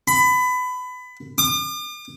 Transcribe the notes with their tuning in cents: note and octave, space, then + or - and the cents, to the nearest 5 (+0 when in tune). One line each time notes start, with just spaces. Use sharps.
B5 +25
D6 +45